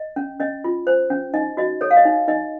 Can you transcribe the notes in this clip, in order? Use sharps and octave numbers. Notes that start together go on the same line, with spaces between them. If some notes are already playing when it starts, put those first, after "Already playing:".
Already playing: D#5
C#4
C#4 D#5
F4
C5
C#4
D#4 D#5
F#4 D#5
A4 C#5
F5
D#5
D#4
D#4 D#5